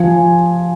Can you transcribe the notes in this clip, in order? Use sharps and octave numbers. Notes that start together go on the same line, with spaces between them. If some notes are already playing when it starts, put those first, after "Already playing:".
Already playing: F3 G#5